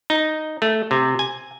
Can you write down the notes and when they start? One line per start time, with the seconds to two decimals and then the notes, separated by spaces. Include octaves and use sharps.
0.10 D#4
0.62 A3
0.91 C3
1.19 G#5